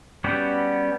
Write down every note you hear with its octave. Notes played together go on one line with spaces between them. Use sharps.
G3 B3 C#4 F#4 G4